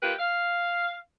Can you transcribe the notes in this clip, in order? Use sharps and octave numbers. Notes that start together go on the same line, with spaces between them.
D#3 A#3 F4 G4 B4
F5